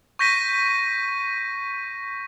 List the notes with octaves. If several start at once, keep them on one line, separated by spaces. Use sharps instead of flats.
C#6 G6 A#6 B6 D#7